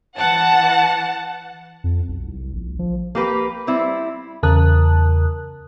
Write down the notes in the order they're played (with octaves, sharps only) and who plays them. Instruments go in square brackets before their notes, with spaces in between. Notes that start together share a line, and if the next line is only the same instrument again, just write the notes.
[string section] E3 F#5 A5
[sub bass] F2
B1
C2
A#1
F3
[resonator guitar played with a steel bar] A#3 G4 B4
G3 C4 E4
[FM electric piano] E2 C#3 A#4 A5 D#6 F#6